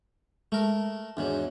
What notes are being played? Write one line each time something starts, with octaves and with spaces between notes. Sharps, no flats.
G#3 A3 A#4
E2 G#2 F#3 D4